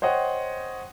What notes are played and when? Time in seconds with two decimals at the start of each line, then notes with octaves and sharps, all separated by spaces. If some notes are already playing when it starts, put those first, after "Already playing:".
0.02 C5 C#5 D#5 F#5 G5